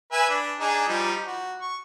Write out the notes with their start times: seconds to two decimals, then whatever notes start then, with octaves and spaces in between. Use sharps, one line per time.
0.12 B4 E5 G#5
0.29 D4
0.60 D4 D#4 G#4
0.89 F3 G3 D#4
1.25 F#4
1.60 C#6